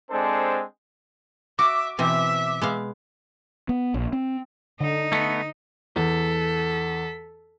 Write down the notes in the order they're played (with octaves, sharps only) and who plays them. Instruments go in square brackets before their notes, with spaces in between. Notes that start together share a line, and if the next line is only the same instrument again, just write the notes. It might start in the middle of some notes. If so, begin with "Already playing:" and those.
[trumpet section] G#3 C4 D4 A4 C5
[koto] F#4 [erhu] E5 [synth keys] D6
[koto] B2 E3 C4 [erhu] E5
[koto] G#3 B3 F5
[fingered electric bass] B3
A#1
C4
[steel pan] D3 [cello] D#4
[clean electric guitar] A3 B3
[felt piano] E2 [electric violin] A4 B6